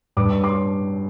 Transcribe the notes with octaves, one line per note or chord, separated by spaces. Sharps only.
G2 D6
C#6
C6 D6